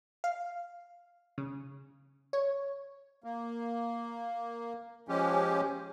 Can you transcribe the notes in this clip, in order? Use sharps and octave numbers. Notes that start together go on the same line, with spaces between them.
F5
C#3
C#5
A#3
F3 G#3 C#4 G4